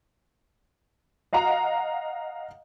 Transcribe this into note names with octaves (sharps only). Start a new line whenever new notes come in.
D#5 F5 F#5 A#5